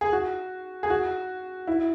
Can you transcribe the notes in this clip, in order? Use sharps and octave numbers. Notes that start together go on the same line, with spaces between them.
G#4
F#4
G#4
F#4
E4